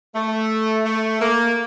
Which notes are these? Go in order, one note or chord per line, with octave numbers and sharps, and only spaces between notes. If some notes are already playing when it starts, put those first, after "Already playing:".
A3
A3
A#3